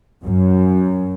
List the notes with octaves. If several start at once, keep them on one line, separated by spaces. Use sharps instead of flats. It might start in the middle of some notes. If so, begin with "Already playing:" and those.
F#2